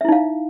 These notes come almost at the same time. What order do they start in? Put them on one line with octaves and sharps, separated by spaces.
E5 E4 D#4 F5